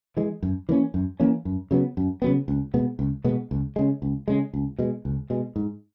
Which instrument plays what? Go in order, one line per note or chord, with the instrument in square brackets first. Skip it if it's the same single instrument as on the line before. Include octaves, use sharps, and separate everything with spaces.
[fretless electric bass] E3 G#3
F#2
E3 A#3 C#4
F#2
E3 A#3 C#4
F#2
C#3 F#3 B3
F#2
C#3 F#3 B3
C#2
B2 G#3 B3
C#2
B2 G#3 B3
C#2
C#3 G#3
C#2
C#3 G#3
C#2
B2 G#3
C#2
B2 G#3
G#2